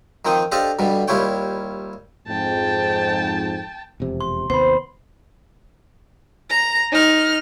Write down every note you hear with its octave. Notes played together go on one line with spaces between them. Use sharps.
D#3 F3 C4 G5 D#6
D4 G4 A4 C5 D#5 F5
G2 B2 D3 G3
D#2 G3 E4 F4 C#5 G5
F2 G#2 G5 A5
E1 F2 C3
C6
D#2 C3 B3 C5 B5 C6
A#5
D#4 F6